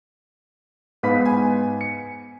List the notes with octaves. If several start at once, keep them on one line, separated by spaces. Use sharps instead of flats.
G#2 B3 B4 F5 B5 B6
G#5
C#7